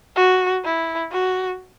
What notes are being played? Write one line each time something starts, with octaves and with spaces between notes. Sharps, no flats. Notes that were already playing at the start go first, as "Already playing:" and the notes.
F#4
E4
F#4